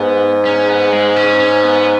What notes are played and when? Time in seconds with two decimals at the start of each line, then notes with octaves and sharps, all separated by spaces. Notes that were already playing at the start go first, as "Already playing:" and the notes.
Already playing: G#2 B3
0.45 C#4
0.69 B3
0.93 G#3
1.16 C#4
1.40 C#4
1.63 B3